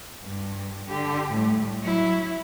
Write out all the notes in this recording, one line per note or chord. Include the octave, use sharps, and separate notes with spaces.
G2
D3 G4
A2 G3
F#3 E4